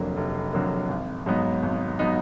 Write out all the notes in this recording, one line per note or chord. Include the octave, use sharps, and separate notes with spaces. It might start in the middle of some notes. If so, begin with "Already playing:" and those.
Already playing: F1 F2 D3 F#3 A#3
F1
F2 D3 F#3 A#3
G#1
G#2 F#3 B3 D#4
G#1
F#3 B3 D#4